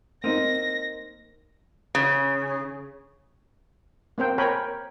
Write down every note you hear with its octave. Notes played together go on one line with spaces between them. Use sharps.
A#3 C4 D#4 A#6
C#3
A#3 C4 C5 G5
A#4 C#5 G5 G#5 B5